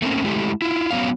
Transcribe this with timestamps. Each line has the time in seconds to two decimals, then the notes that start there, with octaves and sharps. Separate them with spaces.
0.02 A3 A#3 C4 C#4
0.25 G#3 A3 E4 G4
0.62 E4 F4
0.90 F#3 B3 C#4 F5